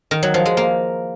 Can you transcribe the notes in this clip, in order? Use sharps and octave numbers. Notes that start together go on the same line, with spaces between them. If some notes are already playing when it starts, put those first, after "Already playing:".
D#3
F#3
F3
G#3
A#3